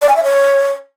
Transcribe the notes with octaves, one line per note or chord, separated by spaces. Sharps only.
D5
G#5
E5
C#5